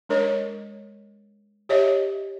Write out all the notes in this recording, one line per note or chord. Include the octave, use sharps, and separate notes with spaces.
G#3 D4 A#4 C#5 D#5
G4 C#5 D#5 E5